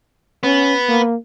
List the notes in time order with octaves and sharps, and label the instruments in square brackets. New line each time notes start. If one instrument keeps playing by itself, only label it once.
[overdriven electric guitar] B3 [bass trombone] C#4
[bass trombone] A#3